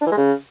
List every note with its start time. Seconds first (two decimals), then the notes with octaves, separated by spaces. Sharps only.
0.01 D4
0.07 E3
0.12 G#3
0.18 C#3